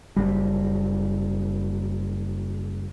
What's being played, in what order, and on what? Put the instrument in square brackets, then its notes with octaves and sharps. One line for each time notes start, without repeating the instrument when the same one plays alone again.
[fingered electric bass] F#1 B1 G3